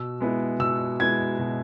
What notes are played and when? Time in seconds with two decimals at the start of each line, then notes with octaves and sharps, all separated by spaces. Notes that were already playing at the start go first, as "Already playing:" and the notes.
Already playing: B2 E6
0.20 G#3 B3 E4
0.60 B2 E6
1.00 G#3 B3 E4 G#6
1.39 B2